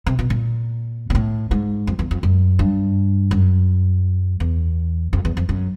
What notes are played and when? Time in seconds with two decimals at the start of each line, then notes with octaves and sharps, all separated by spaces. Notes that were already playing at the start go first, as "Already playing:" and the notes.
0.07 C3
0.19 B2
0.30 A#2
1.10 A#2
1.15 A2
1.51 G#2
1.87 F2
1.99 E2
2.11 F2
2.23 F#2
2.59 G2
3.31 F#2
4.40 E2
5.13 F2
5.25 E2
5.37 F2
5.49 F#2